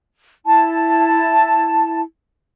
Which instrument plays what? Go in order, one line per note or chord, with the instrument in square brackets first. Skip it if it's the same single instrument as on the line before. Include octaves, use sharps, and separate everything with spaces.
[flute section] E4 A5